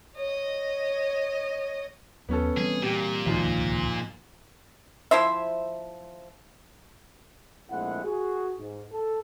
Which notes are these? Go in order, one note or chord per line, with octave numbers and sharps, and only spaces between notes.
C#5 D#5
D#2 F#3 B3 C#4 A4
E3 G3 C4 G#4
A#2 G4 G5
D1 C2 G#2 D#3 F3
F3 E4 C5 E5
A#1 G#3 A3 C4 E4 F#5
F#4 G#4
G#2
A4